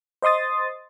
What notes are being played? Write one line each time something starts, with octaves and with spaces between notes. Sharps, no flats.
C5 D#5 C6 D#6 A6